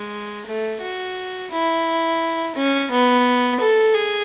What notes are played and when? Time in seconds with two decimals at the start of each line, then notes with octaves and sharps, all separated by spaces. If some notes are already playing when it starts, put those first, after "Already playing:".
Already playing: G#3
0.46 A3
0.81 F#4
1.51 E4
2.55 C#4
2.90 B3
3.60 A4
3.94 G#4